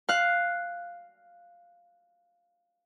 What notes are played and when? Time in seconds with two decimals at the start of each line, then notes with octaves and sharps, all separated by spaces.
0.09 F5 F#6